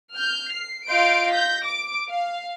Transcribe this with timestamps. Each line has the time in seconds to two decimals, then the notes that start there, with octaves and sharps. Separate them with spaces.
0.16 F6 G6
0.52 C7
0.88 F4 D#5 F5 C6 G6 D7
1.33 G6 A#6 B6
1.65 D6 D7
2.09 F5